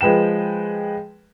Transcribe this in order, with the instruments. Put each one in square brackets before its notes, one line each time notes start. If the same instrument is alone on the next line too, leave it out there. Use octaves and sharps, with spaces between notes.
[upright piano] F3 G#3 B4 G5 E7